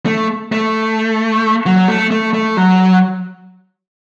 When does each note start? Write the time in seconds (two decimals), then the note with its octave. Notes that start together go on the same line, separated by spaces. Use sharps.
0.06 A3
0.52 A3
1.66 F#3
1.88 A3
2.11 A3
2.33 A3
2.57 F#3